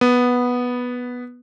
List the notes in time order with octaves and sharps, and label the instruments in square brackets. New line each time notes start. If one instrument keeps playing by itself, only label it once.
[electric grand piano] B3